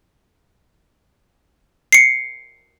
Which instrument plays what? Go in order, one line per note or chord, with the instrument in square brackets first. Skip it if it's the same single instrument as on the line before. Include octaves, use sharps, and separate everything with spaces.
[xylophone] C7 C#7